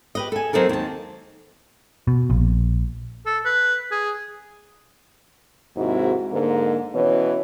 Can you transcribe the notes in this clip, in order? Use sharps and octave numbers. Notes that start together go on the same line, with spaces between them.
G4 B4 D#5
A4 G#5
F#3 C4 D#4 A4 A#4
D#2 A5
B2
A#1
A4
B4
G#4
D#2 G#2 C3 G#3 E4 F#4
G#2 D3 A#3
B2 E3 C#4 C#5